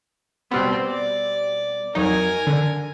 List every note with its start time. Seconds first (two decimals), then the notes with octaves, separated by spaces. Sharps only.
0.51 B2 G3 B3 C4
0.86 D5
1.95 F2 F#3 D#4 A#4 G#5
2.47 D3